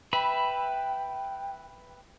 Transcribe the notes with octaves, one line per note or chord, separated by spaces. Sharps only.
B4 E5 G5 B5